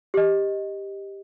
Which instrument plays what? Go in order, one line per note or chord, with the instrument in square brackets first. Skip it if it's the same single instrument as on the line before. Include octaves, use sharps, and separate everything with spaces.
[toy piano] G4 D#5